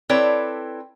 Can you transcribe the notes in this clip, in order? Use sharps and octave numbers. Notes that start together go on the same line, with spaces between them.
C4 E4 A4 B4 C#5 D5